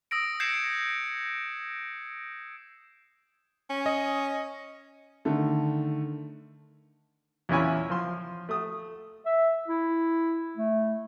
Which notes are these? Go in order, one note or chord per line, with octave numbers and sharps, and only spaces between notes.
D#6 E6 A#6 D7
G6 G#6 A#6 C7 C#7 E7
C#4
D#5
D3 D#3 A3
E2 A#2 C#4 E4 C#5 G#5
F3 C6
A3 D#6
E5
E4
A3